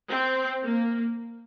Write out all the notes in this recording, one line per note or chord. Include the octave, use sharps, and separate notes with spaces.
C4
A#3